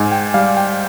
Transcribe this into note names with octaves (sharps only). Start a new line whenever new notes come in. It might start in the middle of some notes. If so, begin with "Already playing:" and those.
Already playing: G#2 G#5
G5
G3 F5
G5